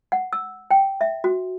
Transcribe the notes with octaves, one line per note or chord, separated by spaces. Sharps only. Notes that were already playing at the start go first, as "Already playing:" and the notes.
F#5
E6
G5
E5
F#4